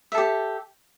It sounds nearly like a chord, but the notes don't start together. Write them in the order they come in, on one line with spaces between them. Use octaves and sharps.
E5 A4 G4